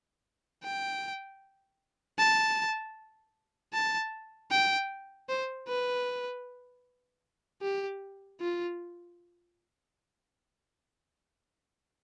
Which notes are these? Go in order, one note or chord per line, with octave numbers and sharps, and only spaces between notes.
G5
A5
A5
G5
C5
B4
G4
F4